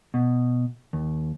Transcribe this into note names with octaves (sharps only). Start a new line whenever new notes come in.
B2
D#2